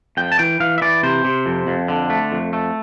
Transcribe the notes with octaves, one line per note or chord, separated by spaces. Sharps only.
F2 G5
A5
E3 G5
E3 F5
E5
E3 D5
C3 C5
C3
F2
F2
D3
A3
F2
A3